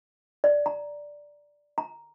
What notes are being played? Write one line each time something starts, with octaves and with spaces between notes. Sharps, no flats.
D5
A#5
A#5